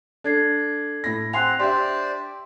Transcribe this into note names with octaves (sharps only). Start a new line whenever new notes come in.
D4 A4 G#6 C7
A2 B5 A#6
C4 F#5 G#5 C6 F#6 C7 F7
D4 G4 C5 D5 E5 C6